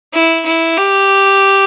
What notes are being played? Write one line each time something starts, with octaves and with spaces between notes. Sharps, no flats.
E4
E4
G4